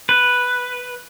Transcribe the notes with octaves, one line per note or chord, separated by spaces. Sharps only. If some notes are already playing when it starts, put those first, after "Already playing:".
B4